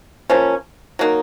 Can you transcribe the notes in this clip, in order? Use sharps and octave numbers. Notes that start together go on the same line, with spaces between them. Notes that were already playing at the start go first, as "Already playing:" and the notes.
F3 A#3 C#4
F#3 A#3 D#4